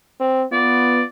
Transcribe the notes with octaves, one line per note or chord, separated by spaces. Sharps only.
C4
B3 F4 D5